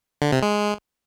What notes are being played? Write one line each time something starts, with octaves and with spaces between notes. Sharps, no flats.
D3
C3
G#3